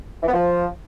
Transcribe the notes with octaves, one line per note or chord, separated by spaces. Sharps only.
E3
B3
F3